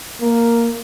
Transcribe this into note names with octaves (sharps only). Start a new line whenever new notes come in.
A#3